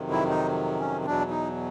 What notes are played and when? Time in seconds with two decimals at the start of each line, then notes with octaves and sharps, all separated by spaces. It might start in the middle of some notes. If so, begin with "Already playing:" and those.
Already playing: F2 C3 D#3 F#3
0.10 E4
0.29 D#4
0.79 C#4
1.05 E2 B2 F#3 D4
1.30 D#4